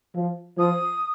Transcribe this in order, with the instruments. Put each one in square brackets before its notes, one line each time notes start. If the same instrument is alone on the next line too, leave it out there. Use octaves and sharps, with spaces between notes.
[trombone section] F3
[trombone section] F3 [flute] D#6